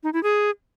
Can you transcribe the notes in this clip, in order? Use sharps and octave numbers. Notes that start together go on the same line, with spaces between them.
D#4
E4
G#4